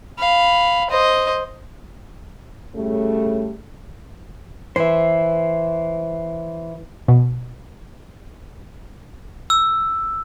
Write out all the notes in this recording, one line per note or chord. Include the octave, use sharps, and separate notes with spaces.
F5 B5
C5 D#5
A2 C#3 G3 A3
E3 C5 E5
B2
E6